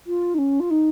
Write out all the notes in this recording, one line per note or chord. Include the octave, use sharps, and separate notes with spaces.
F4
D#4
C#4
F4
D#4